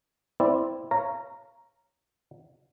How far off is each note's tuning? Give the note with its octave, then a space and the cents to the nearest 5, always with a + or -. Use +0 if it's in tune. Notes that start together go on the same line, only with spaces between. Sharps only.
C4 +0 E4 -5 D5 +0
C#5 +0 F5 -20 A#5 +0